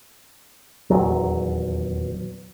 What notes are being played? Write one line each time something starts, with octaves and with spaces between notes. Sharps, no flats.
D#1 E2 F#3